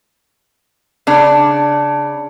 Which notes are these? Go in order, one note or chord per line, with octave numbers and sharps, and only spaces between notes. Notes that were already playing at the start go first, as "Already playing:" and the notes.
C#3 D4